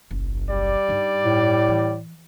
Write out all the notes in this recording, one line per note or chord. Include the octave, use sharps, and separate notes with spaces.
F#1 B1
G3 D5
G2 D#4
A2
E3